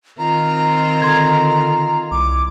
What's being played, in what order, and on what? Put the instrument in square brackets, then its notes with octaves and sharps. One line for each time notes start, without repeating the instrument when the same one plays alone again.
[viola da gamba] D#3 C4 F4 [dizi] A#5
[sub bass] D3 [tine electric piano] C6 G#6
[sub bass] C2 [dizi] D6